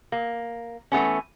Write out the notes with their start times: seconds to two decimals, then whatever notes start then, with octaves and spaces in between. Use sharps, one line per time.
0.12 A#3
0.92 E3 A3 B3 C#4